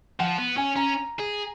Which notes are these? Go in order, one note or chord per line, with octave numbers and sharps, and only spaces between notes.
F3 F#5
B3
C#4 G#5
C#4 A#5
G#4